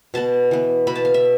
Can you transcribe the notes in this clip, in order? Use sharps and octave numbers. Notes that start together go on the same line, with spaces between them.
B2 B3 A5
E3 B3
B2 B3 B5
A5
F5
E5